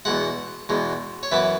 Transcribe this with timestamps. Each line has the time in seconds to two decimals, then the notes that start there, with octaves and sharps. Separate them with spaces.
0.05 E2 B2 G#3 F#5
0.69 E2 B2 G#3
1.23 C#5
1.31 F#2 E3 B3 E4 E5